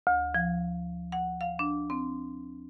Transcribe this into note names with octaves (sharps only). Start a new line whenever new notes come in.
D2
F3
F#5
F5
D4
C4